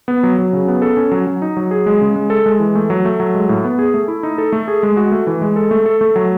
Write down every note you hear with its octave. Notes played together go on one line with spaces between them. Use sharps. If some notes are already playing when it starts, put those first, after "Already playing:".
B3
F#3
F#3
C#3
B3
A4
C#4
F#3
F#3
D#4
F#3
G#4
G#3
C#3
G#3
A4
G#3
E3
A3
F#3
A3
F#3
G#3
A2
B3
G#4
A3
E4
D#4
A4
A3
G#4
G#3
F#4
A3
E3
G#3
A4
A3
A4
A3
F#3